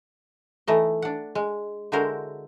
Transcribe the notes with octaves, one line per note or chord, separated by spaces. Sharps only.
E3 A3 D#4 D#5
D4 F#5
G#3
D3 G#3 E4 F#4 A#4 C5